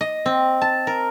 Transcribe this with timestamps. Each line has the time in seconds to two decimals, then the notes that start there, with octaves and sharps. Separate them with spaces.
0.01 D#5
0.26 C4
0.61 A5
0.87 A#4